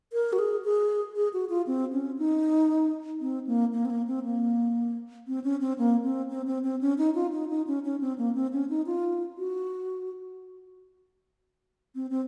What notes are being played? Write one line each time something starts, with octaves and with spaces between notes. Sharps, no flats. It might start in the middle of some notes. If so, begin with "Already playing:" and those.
A#4
F#4
G#4
G#4
G#4
F#4
F4
C4
C#4
D#4
C4
A#3
A#3
C4
A#3
C4
A#3
C4
C#4
C4
A#3
C4
C4
C4
C4
C#4
D#4
F4
D#4
D#4
C#4
C#4
C4
A#3
C4
C#4
D#4
F4
F#4
C4
C4